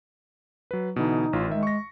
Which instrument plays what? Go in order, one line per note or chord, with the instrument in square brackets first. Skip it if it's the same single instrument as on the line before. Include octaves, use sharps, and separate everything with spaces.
[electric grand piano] F#3 B4
[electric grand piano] B2 D3 E3 [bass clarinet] D#4
[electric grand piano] A1 F4
[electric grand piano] D#3 E5 [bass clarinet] G#3
[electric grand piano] C#6 A#6